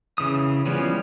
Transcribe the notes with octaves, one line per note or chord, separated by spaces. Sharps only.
C#3 E3 D#6
E3 F3 G3 B3 C#4